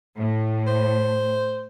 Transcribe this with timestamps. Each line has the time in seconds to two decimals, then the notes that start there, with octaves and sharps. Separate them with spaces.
0.17 A2
0.67 C5